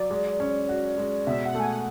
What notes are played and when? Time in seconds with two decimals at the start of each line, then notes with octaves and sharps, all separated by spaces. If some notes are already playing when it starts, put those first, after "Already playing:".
Already playing: F#3 D5
0.11 G#3
0.40 C#4
0.69 F#4
0.98 G#3
1.27 B2 E5
1.46 F#5
1.55 A3 G#5
1.65 F#5